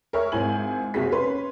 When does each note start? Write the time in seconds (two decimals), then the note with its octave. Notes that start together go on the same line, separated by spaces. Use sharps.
0.13 A#4 C#5 E5 F6
0.32 G#1 G#2 E4 G#5 F#7
0.94 F#1 C3 F#4 G#4 B6
1.12 C#4 B4 C6